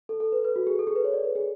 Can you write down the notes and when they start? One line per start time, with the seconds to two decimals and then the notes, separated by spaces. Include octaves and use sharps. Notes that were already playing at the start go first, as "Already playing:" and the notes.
0.09 A4
0.20 A4
0.32 B4
0.44 B4
0.56 F#4
0.67 G#4
0.79 A4
0.87 G#4
0.95 B4
1.04 C#5
1.14 D5
1.25 B4
1.36 G#4